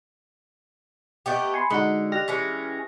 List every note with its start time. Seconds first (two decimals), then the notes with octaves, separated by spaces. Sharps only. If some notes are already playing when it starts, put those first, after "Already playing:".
1.26 A3 B3 G4 D#5 F#5 G5
1.54 G#5 B5 C6 C7 C#7
1.70 D3 G#3 D#4 F#4 D#6 B6 C#7
2.12 G4 D#5 F6 F#6 A#6 F7
2.28 E3 G#3 C#4 B6